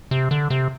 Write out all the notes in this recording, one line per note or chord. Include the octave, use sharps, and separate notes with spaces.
C3
D3
C3